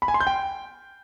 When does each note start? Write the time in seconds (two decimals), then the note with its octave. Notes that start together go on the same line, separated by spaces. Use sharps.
0.02 B5
0.08 G#5
0.14 C6
0.20 G6
0.27 G5